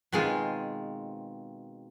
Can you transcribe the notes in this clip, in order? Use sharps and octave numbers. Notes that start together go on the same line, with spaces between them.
B2 D#3 G#3 C4 F4